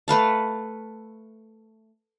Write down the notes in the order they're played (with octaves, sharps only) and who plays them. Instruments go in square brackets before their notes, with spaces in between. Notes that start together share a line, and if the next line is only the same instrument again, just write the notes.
[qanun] A3 B4 F5 A5